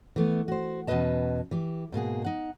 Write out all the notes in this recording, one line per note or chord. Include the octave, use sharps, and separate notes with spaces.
E3 A3 B3
F#4 C5
E2 B2 C#4 B4 D#5 A5
E3 G4
G#2 B2 A#3 G#4
D#4 F#5